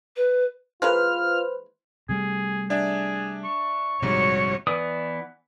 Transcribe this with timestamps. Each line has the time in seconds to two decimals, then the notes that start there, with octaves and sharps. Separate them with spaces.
0.16 B4
0.82 E3 G#3 A#3 F4 B4 C5 F6
2.09 C3 G3 A3 G#4
2.70 D4 G#4 D5 E5
3.44 C#6
4.02 A#1 G#2 C3 G3 F#4 C#5
4.67 E3 B3 D5 D#6